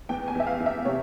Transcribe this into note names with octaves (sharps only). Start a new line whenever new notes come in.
E2 G5
G#5
E2 E5
F5
E2
E5
C3 C#5